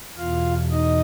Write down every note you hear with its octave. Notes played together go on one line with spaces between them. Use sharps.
E2 B2 F4 F5
D#4 D#5